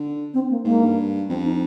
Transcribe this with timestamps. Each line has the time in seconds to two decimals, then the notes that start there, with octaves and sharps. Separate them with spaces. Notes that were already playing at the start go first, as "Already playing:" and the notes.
Already playing: D3
0.34 C4
0.50 A#3
0.65 G#2 A#3
0.81 G2
1.28 F2 C4
1.45 D#4